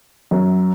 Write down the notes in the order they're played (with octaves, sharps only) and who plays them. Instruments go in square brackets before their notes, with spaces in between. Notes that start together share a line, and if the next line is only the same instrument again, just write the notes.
[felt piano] F#2